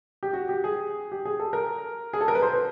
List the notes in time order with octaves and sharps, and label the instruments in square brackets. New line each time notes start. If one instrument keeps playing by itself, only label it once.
[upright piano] G4
F#4
G4
G#4
G4
G#4
A4
A#4
G#4
A4
A#4
B4
C5
B4